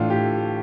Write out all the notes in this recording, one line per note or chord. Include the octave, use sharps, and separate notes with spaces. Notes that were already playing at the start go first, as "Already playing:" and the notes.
Already playing: A2 E3 A3 D4 F4
G4